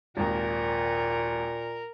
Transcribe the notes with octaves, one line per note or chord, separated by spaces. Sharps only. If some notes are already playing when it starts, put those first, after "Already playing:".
G#1 D#2 A#2 A#4